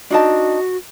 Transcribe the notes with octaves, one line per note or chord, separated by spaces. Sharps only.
D4 D#4 F#4 A5